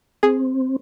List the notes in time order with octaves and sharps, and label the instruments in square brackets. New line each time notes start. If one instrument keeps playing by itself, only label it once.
[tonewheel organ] C4 [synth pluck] G#4